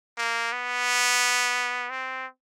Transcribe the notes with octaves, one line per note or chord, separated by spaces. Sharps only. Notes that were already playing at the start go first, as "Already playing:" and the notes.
A#3
B3
C4